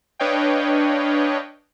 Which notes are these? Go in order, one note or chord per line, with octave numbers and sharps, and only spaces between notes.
D4 B4 C#5 D#5 F5 G5